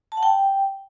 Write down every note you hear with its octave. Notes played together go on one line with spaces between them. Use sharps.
A5
F#5
G5